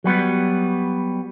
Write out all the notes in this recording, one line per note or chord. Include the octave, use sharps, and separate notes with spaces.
F#3 G3 B3